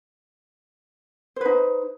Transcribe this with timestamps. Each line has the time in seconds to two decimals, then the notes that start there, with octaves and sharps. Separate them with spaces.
1.36 C5
1.41 B4
1.45 D#4